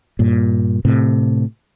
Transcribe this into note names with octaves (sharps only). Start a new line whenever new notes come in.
G2 A#2
A2 C3